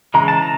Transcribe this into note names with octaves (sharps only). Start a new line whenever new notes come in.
C#3 E3 G#3 A#5
A5
A#5